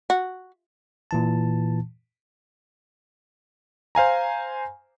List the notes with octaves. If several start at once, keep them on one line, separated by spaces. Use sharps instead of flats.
F#4
A#2 E3 A5
C5 F5 G#5 A#5